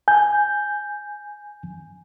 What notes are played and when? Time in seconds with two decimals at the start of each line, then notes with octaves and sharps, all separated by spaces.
0.08 G#5 G6